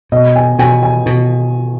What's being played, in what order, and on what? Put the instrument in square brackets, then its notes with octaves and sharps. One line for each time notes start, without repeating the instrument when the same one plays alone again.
[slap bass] B2 [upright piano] D#5
[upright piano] G#5
[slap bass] B2 [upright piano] G#5
[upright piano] G#5
[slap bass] B2